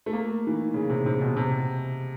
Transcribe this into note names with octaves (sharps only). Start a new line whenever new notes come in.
A3
A#3
E3
D#3
C#3
C3
C3
B2
C3